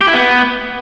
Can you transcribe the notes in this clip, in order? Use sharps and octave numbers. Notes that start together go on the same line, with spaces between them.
G4
E4
B3